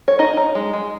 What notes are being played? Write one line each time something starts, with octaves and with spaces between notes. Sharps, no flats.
C#5
D#4 D#5
D#4
G#3
G#3